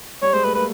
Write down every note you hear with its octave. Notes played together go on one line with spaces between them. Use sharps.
G3 C#5
G#3 C5
A3 B4
A#3 B4